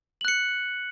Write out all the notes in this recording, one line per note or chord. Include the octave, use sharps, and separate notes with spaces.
F#6 C#7 F#7